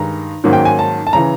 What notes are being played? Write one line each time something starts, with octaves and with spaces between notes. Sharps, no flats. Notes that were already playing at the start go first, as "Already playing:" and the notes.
Already playing: G2 D#3 G#3 A#5
G#2 D#3 F#3 A#3 C#4
G5
G#5
A5
A5
C#3 E3 A#5